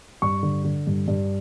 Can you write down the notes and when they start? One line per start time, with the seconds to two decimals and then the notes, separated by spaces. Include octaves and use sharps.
0.22 G2 C#6
0.43 D3
0.65 D3
0.87 G2
1.08 G2